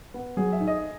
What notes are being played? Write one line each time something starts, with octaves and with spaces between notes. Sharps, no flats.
B3
F#3 G#4
E5
D#4
D#5